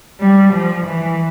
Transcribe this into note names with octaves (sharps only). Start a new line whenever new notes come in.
G3
F3
E3